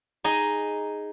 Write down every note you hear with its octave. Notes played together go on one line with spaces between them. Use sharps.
D#4 G#4 D#5